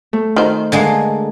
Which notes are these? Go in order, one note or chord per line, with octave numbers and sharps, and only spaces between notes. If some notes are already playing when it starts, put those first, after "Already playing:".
A3
D#3 C5
D3 G#3 A#3